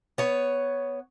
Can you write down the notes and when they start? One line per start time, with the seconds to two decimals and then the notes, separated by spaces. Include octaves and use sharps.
0.18 B3 C#5